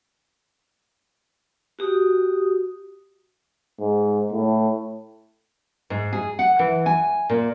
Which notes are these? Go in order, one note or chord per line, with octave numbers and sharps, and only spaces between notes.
F#4 G4 D#6
G#2
A2
G#2
G#4
F#5
E3
G#5
A#2